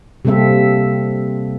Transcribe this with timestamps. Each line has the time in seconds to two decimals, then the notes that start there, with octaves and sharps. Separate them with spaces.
0.25 C3 G3 A#3 C4 A4 E5